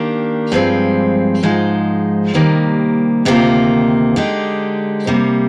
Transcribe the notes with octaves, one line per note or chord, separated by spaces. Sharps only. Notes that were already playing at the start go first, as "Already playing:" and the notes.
Already playing: D#3 A#3 D4 G4
G2 F3 G#3 C4
G#2 F3 G#3 D#4
C3 D#3 G3 A#3
D2 C3 D#3 A#3 F4
D3 G#3 D#4 G4
C3 G3 A#3